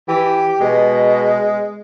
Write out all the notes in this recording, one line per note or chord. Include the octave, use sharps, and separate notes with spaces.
E3 G4
B2 G#3